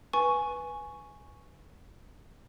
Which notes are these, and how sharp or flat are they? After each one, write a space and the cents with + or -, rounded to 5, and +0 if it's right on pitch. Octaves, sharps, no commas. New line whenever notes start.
B4 -10 G#5 +5 C#6 +0